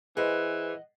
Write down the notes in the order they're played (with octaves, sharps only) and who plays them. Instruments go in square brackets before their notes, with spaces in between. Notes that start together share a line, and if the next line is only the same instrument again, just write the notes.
[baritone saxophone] E3 [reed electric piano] G#4 B4 C5 [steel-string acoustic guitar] D#5 F#5